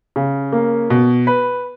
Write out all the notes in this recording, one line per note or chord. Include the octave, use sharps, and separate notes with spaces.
C#3
A#3
B2
B4